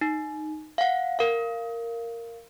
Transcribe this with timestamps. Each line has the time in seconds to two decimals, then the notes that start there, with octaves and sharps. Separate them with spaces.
0.01 D#4
0.78 F5 F#5
1.19 A#4 F5